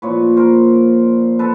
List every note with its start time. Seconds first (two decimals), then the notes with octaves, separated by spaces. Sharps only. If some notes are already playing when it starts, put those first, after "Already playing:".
0.02 A#2 F3 A#3 B4 C#5
0.36 A#4 C5
1.39 A4 B4